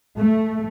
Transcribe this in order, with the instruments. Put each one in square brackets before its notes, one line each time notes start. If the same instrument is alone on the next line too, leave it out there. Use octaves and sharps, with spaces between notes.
[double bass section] A3